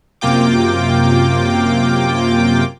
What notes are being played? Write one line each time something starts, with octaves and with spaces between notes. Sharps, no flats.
F#2 C3 A#3 F4 G5 D6